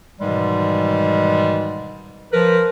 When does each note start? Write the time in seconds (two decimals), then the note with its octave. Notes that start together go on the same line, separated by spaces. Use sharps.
0.20 G#2 B2 D#3 E3 G3 G#3
2.32 F3 A#4 B4